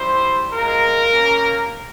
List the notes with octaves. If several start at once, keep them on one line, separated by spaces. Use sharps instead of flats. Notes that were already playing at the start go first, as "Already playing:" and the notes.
Already playing: G3 C4 E4 G4 C5
G#3 C4 F4 A#4
A#3 C#4 G4